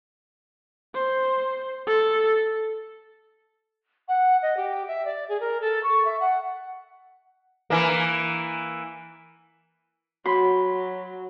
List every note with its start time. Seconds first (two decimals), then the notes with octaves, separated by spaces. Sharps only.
0.95 C5
1.87 A4
4.08 F#5
4.42 D#5
4.57 G4
4.88 E5
5.05 D5
5.29 G#4
5.40 A#4
5.61 A4
5.83 C#6
6.05 E5
6.20 F#5
7.70 E3 A#3
10.25 F#3 F#4 B5 C6 B6